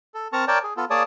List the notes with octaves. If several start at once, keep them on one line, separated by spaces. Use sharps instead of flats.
A4
C4 A#4 A5 A#5 C#6
A#4 C#5 D5 G5 A5
G#4
B3 F4 A4
A#3 G#4 C#5 D5 A5 D#6